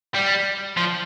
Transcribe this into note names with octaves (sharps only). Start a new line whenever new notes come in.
G3
F3